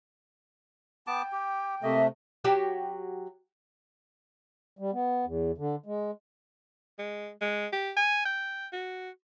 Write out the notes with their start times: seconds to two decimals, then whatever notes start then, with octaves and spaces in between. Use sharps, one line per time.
1.07 B3 G5 A5 D6
1.32 G4
1.83 C3 A3 A#3 D#5 E5
2.44 F#3 F#4 G4
4.79 G3
4.93 B3
5.25 E2
5.58 D3
5.86 G#3
6.99 G#3
7.41 G#3
7.73 G4
7.97 G#5
8.26 G5
8.73 F#4